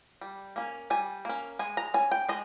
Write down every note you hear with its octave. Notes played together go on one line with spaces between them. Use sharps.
G3
A#3 C#4
G3 G#5
A#3 C#4
G#3 G#5
A#5
C#4 G#5
G5
G#3 D#5